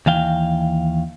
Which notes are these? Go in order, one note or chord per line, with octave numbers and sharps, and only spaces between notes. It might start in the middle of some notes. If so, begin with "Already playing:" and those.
D#2 E3 F5 G5